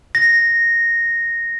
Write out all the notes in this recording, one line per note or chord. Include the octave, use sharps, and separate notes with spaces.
A#6